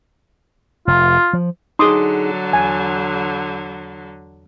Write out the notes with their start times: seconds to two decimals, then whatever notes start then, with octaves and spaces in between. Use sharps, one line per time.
0.87 F1 F4
1.33 F3
1.79 D3 F#3 D#4 G#4 C6 D6 D#6
2.53 E2 G#5